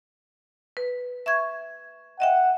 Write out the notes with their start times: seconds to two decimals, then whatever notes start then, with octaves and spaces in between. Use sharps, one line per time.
0.77 B4
1.26 E5 C#6 G#6
2.20 D#5 E5 F#5 G5